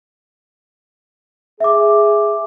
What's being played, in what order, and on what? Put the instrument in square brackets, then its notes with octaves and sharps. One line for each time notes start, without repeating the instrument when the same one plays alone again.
[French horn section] G#4 [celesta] E5 D6